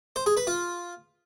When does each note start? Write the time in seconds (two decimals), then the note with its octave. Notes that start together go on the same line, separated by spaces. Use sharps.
0.16 C5
0.26 G#4
0.37 B4
0.47 F4